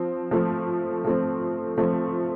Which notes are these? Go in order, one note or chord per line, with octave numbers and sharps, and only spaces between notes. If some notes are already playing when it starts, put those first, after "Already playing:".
Already playing: F3 C4
F3 A3 C4
F3 A3 C4
F3 A3 C4